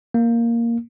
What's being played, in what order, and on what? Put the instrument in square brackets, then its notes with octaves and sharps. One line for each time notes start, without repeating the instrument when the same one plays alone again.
[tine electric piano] A#3